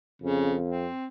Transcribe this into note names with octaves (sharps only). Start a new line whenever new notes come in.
F2 C#3
C4